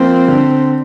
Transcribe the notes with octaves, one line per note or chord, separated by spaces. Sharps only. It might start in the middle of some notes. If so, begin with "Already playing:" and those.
Already playing: F3 A#3 C4
D3